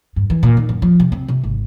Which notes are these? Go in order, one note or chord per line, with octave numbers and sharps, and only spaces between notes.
G2
E3
A#2
D#3
F#2
F3
C3
C4
C3
G#1